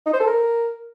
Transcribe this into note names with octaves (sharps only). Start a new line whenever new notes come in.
D#4
C5
A4
A#4